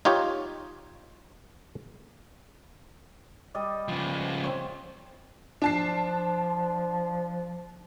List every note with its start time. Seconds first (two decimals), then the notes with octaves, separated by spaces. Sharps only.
0.05 D#4 F4 G4 C#5
3.54 G3 D5 D#5
3.88 C#3 F3
4.44 C4 C5 C#5
5.62 F3 D4 A5 C7